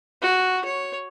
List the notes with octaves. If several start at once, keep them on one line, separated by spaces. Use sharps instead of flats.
F#4
C#5